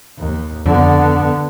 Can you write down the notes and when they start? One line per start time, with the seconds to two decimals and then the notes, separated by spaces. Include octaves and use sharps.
0.18 D#2
0.66 F2 D3 B3